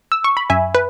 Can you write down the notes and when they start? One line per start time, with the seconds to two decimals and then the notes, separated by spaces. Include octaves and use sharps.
0.12 E6
0.24 C#6
0.37 B5
0.50 F#2 E5 G#5
0.75 B4